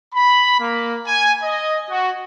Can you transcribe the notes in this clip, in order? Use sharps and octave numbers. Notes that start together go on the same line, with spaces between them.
B5
A#3
G#5
D#5
F#4